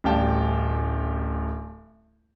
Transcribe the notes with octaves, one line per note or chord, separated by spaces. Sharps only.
D1 A1 G3 F5 G5 A5